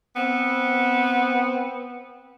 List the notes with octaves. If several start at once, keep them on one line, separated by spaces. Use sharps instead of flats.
B3 C4